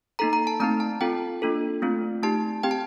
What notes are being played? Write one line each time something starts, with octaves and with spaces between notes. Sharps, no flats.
A#3 D#4 A4 A#5
A#5
A5
A3 C4 D#4 A#5
A5
C4 F4 A4 G5
A#3 D4 F4 A4
A3 C4 F4
A3 D#4 G4 A5
C4 G4 G5
A5